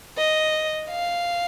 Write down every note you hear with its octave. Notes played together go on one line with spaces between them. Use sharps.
D#5
F5